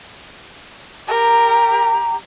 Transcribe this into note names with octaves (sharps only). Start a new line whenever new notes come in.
G4 A#4 G5 A#5